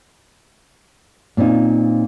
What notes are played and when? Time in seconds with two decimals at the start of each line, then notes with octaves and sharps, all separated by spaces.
1.37 A#2 C4 C#4 D#4 F4